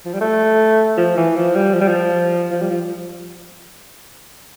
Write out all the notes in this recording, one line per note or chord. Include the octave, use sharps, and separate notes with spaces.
F3
G3
A3
F3
E3
F3
G3
F3
G3
F3
F3
G3
F3